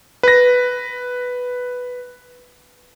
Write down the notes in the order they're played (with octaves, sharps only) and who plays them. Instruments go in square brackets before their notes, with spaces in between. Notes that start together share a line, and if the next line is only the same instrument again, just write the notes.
[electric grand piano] B4 A#6